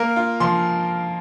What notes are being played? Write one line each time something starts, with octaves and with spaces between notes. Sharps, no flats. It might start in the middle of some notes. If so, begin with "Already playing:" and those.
Already playing: A#3 A#4
F4
F3 C6